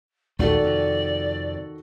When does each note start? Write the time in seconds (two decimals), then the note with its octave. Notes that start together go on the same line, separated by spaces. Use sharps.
0.39 A#1 D#2 D#3 A3 F#4 A4 D5
0.64 F2 C3